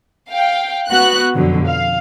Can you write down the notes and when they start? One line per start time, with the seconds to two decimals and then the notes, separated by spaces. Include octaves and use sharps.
0.29 F5 G5
0.88 B3 F#4 F#6
1.34 F2 B2 D3 F#3
1.67 F5